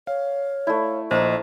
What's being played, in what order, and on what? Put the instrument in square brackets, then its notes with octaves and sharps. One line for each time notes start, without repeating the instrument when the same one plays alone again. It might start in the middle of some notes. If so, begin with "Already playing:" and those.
[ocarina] C#5 [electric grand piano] F5
[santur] A3 E4 [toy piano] D5
[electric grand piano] A#1 [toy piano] C5 A#5 [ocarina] D#5 [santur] A5